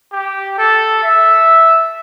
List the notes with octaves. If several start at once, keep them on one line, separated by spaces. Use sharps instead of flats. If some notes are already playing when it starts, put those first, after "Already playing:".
G4
A4
E5